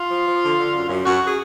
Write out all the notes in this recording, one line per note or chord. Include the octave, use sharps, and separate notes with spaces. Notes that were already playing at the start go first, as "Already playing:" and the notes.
Already playing: F4
F3
F3
D3
D3
F#2
F#2
F#2 F#4
G#4